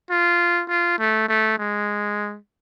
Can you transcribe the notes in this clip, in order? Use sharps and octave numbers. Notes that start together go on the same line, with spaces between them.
F4
F4
A3
A3
G#3